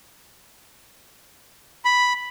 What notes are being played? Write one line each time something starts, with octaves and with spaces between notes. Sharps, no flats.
B5